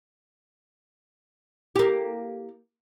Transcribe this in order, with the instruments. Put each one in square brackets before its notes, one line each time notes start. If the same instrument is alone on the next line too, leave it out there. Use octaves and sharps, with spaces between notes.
[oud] A#3 G4